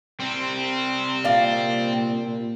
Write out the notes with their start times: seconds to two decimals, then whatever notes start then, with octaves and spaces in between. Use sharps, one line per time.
0.20 C3 G3 C4
1.24 A#2 D5 F5